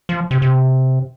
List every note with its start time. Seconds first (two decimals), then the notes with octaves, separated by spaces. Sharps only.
0.09 F3
0.31 C3
0.42 C3